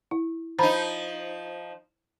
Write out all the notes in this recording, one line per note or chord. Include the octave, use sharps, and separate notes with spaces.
E4
F3 D#4 C5 A#5 B5